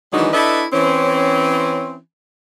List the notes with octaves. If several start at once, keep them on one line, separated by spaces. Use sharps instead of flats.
D#3 E3 F#3 G#3 D4 D#4
D4 E4 A4 B4 D#5 E5
E3 C4 C#4